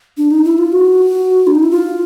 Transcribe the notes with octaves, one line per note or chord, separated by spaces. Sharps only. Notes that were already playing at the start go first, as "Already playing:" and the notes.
D4
D#4
E4
F4
F#4
D4
D#4
E4
F4